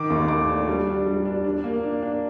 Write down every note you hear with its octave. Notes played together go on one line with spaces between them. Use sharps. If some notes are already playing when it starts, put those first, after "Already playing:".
Already playing: D#3 D6
D#2
A3 D6
D4
G3
D4
G3
D4
D4
A#3
D4
D4